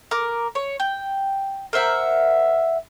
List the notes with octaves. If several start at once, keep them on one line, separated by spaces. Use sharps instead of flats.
A#4 D6
C#5
G5
A#4 C5 E5 F#5